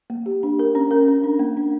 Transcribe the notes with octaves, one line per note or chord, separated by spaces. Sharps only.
A#3
G4
D4
A#4
C#4
A#4
C#4
D4
A#3
D4